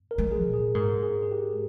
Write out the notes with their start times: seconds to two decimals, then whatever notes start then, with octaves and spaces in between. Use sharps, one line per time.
0.11 A#4
0.18 G#3
0.32 G#4
0.46 A#2
0.53 G#4
0.75 G#2 A#4
1.03 G#4
1.23 G#4
1.32 G4